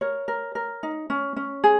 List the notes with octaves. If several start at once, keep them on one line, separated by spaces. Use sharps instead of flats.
A#4 C#5
A#4
A#4
D#4
C#4
C#4
G#4